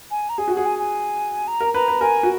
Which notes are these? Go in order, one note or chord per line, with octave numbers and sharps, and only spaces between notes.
G#5
A#5
G#4 G#5
F#4
G#4 F#5
G#5
G#5
A#5
A#4
B4 A#5
B4
A#4 G#5
F#4